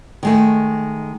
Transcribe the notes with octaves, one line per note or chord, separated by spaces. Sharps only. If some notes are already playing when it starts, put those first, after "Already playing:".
D#3 G#3 A3